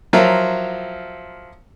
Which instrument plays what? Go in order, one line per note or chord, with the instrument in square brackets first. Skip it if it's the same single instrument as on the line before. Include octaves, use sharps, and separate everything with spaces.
[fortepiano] F3 F#3 E4 F4 A#4 E5